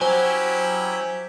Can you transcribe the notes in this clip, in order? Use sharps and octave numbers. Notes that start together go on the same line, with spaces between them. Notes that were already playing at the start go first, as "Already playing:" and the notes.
F#3 C#4 E4 G4 C5 G#5